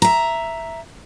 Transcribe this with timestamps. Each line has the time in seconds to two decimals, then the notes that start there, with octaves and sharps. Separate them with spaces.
0.02 E5 A#5